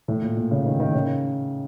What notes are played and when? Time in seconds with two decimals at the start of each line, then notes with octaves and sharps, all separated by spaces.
0.08 A2
0.22 A#2
0.37 A#2
0.51 C#3
0.66 D#3
0.80 D#3
0.95 C#3